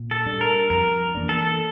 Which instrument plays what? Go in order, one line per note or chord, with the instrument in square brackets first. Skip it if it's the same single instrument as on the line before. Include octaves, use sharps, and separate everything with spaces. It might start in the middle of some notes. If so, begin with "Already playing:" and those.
Already playing: [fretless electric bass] A#2
[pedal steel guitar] A4
[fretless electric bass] G3 D4
[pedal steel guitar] A#4
[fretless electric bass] F2 [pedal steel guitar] A#4
[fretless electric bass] E3 A#3 D4
[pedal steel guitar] A4